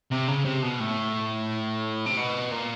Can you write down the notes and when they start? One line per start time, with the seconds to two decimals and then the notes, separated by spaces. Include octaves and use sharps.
0.11 C3
0.28 C#3
0.45 C3
0.63 B2
0.80 A2
2.06 C3
2.17 B2
2.51 A#2